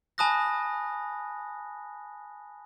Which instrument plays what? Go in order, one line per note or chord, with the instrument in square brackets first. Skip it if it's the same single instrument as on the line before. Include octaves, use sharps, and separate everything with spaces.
[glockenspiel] G#5 A5 B5 D#6 F#6 A#6